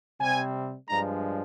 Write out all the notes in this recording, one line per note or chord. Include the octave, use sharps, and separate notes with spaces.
C3 G3 C4 G#5
G2 F3 G#3 D4 A#5